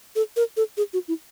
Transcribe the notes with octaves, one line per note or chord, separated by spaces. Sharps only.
A4
A#4
A4
G#4
F#4
E4